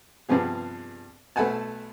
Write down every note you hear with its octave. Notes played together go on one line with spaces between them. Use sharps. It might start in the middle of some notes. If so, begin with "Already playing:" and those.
G2 C3 F3 B3 G#4
B1 A3 B4 F#5 G#5 A5